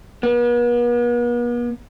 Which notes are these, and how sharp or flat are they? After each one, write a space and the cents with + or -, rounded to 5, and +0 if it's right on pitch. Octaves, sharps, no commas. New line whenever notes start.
B3 -45